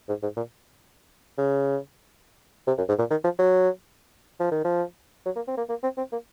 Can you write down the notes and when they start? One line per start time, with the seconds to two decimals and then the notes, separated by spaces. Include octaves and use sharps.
0.08 G#2
0.22 G#2
0.37 A#2
1.38 C#3
2.67 C3
2.78 F#2
2.88 G#2
2.99 A#2
3.10 D#3
3.24 F3
3.38 F#3
4.40 F3
4.51 D#3
4.64 F3
5.25 F#3
5.36 A#3
5.48 C4
5.57 A#3
5.69 A#3
5.83 C4
5.97 C4
6.12 A#3